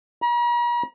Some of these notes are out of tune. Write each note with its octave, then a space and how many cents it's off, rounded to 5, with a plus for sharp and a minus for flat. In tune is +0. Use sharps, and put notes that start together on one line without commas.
A#5 +45